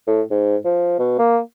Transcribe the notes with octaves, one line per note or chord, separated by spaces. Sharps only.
A2
G#2
F3
B2
A#3